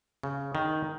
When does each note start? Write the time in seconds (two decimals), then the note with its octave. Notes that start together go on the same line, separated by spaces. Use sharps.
0.23 C#3
0.55 D#3